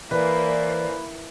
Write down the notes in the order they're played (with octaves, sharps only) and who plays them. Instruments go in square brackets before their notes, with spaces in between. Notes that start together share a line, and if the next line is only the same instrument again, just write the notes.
[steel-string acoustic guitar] E3 [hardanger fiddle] A#3 E4 [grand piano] B4 [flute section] C5 D5 G#5